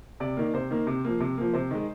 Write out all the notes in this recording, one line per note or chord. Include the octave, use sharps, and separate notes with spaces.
C3 D5
D#3 A#3
C3 C5
D#3 A#3
C3
F3 A#3
C3
F3 A#3
C3 C5
D#3 G#3